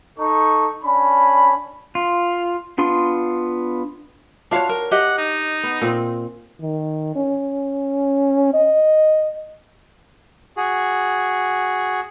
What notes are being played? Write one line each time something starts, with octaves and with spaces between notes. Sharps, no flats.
D#4 A4 C#6
C#4 D4 B5
F4
B3 D4 F4 C6
D4 F4 F#4 C#5 F5
A#4
G4 D#5 F#5
D#4
B3
A#2 C4
D#3
C#4
D#5
F#4 G#4